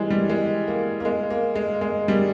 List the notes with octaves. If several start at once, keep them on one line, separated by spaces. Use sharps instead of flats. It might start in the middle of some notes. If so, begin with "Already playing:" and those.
Already playing: E3 G3 G#3
G3
G#3
A#3
A#3
G#3
A#3
G#3
G#3
G3